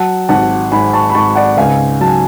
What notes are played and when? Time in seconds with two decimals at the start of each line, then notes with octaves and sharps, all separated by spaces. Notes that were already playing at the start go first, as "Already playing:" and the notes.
Already playing: F#3 F#5 A5
0.29 G#1 F#5 A5
0.72 G#2 G#5 B5
0.93 A5 C#6
1.10 B5
1.15 G#2 A5 C#6
1.36 D5 F#5
1.57 C#2 F5 G#5
2.01 F#3 A5
2.07 G#5